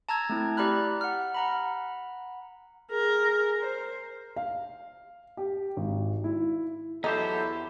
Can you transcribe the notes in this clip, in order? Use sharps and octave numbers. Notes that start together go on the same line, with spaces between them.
A5 A#5 E6 G#6
A3 C4 E4
G4 D5 A#5 B5 F6 F#6
F#5 F6
F#5 A#5 B5
G#4 A#4
C5
F5
G4
G#1
E4
E2 F#3 D#4 E4 G4 A4 C5